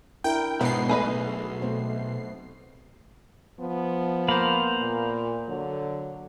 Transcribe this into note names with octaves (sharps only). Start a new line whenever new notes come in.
D4 E4 A#4 G5
G#2 B2 B3 C7
B1 A3 G#4 B4 D#5
A3 C4 C5
F3 B3
A#3 C5 F5 B5
A#2
D3 F#3